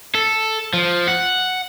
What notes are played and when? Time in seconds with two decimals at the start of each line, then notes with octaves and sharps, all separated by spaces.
0.15 A4
0.74 F3
1.08 F#5